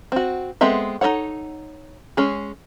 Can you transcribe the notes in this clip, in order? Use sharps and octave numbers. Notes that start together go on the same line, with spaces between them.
C4 F#4
G#3 B3 C4 A4 E5
D#4 F#4 A4 C#5 F#5
G#3 C#4 G#4